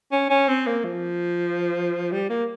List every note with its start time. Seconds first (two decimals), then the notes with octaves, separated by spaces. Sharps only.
0.12 C#4
0.30 C#4
0.48 C4
0.66 A#3
0.84 F3
2.11 G3
2.29 A#3